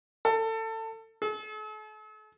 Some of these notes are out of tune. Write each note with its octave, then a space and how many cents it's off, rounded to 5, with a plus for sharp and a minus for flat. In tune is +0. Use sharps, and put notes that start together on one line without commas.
A4 +25
A4 -45